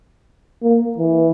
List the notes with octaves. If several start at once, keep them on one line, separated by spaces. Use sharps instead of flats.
A#3
E3